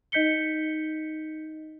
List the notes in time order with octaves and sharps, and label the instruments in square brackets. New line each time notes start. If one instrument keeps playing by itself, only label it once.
[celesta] D#4 D#5 G6 B6 C#7 G7